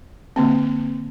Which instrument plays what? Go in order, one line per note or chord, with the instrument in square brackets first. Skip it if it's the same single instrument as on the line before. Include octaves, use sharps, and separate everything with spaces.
[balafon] D3 A#3 C4